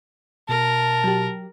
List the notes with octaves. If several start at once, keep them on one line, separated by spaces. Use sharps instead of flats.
B2 A#4 A5
F#3 G4